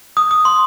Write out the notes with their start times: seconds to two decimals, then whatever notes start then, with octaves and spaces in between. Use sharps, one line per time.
0.17 D#6
0.31 D#6
0.45 C6